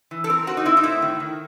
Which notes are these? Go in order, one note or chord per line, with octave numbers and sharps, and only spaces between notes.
E3
A4
C4 A#4
C4 F#4
D#4
C4 E4
D#4
A2 E4
D#3
D#3